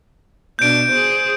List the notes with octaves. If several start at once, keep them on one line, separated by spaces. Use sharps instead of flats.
B2 D4 G6 D7
G#4 C5